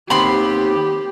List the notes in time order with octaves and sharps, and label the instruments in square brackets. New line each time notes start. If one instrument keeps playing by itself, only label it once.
[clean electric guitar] D#2 B3 C4 [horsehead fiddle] G4 [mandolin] B5 C6